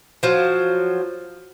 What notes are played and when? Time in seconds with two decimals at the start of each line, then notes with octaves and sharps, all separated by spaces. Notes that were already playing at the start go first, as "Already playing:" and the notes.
0.23 F3 F#3